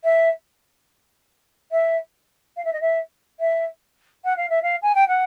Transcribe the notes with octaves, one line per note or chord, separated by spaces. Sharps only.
E5
E5
F5
E5
D#5
E5
E5
F#5
F5
E5
F5
G#5
G5
F#5